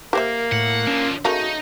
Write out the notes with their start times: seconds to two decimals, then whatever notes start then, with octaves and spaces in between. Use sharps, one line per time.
0.13 A#3 G4 A#4 C5 E5
0.52 A2 F#5
0.87 D3 F3 C#4
1.25 C#3 A3 A#3 D#4 F#4